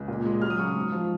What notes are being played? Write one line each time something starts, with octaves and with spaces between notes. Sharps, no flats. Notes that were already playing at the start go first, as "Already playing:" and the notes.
Already playing: C#2
A#2
G#3
F#3 F6
D#6
C#3 C#6
D#6
G#2
F3